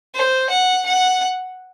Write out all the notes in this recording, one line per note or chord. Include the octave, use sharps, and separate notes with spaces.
C5
F#5
F#5